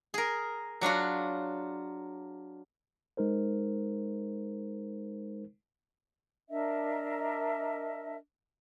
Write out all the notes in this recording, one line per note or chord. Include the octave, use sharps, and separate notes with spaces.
G#4 A#4
F#3 D4 F4 F#4
G#3 D#4 A#4 C5
D4 A#4 D#5 E5